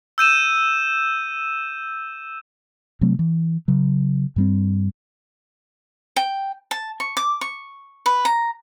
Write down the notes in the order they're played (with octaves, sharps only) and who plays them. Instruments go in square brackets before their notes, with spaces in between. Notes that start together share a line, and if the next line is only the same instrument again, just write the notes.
[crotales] E6 G6 D#7 E7
[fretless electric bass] C3 F#3 A3 C4
E3
C#3 F#3
G2 G3 C4
[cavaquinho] G5
A5
C#6
D6
C#6
B4
A#5